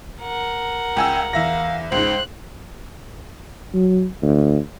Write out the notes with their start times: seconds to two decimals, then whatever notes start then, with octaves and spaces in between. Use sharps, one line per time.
0.21 A#4 F#5
0.97 C#2 G5 G#5 E6
1.33 E2 E5 F5 A#6
1.92 C#2 G#2 C5 F#6
3.74 F#3
4.22 D2